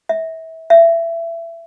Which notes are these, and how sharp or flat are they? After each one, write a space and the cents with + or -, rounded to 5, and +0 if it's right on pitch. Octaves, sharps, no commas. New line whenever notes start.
E5 -25
E5 +25